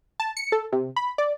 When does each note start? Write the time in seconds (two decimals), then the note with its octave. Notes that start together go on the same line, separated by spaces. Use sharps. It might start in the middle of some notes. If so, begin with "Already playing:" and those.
0.20 A5
0.37 C#7
0.52 A4
0.72 C3
0.96 B5
1.18 D5